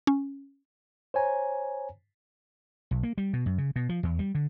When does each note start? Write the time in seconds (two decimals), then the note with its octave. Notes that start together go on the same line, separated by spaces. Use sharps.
0.07 C#4
1.14 C5 C#5 G#5 A#5
2.91 B1
3.03 A#3
3.18 G3
3.33 B2
3.46 F#2
3.58 C#3
3.76 B2
3.89 F3
4.03 E2
4.19 G3
4.35 D3